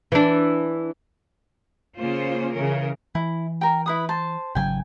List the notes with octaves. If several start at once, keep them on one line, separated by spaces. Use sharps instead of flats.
E3 D4
C#3 A#3 C#4 F4 C5
C#3 E3 C#4 A#4
E3 E4
A#4 G5
E4 B4 D#6
C5 A5
G#1 C#3 F#3 G5 G#5